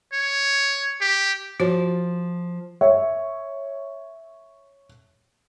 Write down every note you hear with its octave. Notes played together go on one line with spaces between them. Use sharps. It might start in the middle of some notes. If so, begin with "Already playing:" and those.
C#5
G4
F3 F#4 C#5
C#5 E5